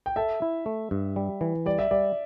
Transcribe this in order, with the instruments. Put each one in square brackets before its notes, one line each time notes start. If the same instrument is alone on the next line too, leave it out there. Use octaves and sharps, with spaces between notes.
[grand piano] G5
[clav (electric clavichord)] A4 [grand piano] E5
[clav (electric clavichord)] E4
A3
G2
G3
E3
[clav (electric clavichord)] G3 [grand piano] D5
[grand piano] E5
[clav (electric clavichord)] G3 [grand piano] D5